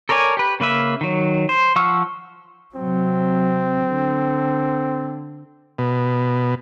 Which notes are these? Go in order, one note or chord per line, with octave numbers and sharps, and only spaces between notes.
A4 A#4 C#5 D5 G#5
G4 B4
C#3 A#3 B4 E5
D#3 F#3
C5
F3 F#5 C#6 E6 F6
C3 F#3 C4
D3
B2